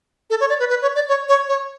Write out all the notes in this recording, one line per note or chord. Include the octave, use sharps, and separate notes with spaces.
A4
C#5
D5
B4
B4
C#5
D5
C#5
C#5
C#5